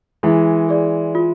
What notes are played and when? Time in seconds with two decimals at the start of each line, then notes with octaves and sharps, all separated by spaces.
0.23 E3 G#3 E4
0.69 G#4 D5
1.15 F4